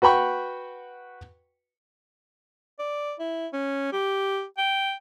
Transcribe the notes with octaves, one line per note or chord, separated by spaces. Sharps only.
F#4 B4 G5 B5 C#6
D5
E4
C#4
G4
G5